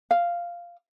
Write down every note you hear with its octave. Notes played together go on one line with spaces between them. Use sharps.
F5